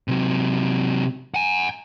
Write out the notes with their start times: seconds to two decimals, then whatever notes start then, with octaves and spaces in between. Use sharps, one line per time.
0.08 C3 F#3
1.34 F#5 G#5